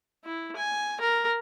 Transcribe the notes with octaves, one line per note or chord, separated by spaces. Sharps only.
E4
G#5
A#4